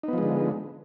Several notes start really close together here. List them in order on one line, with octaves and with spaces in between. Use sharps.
D#4 B3 F3 G#3 D3